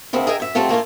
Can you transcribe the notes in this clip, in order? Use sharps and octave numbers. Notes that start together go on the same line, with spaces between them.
D2 C#3 C4 E4 A#4
G#4 A#4 D#5 E5 G5
F#2 E5
F#3 G3 A3 C4 F4
A3 A#3 C#4 F4